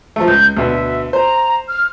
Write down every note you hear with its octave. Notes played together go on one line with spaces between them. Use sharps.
F3 A3
C#2 G6
D2 B2 E5
C5 A#5
F6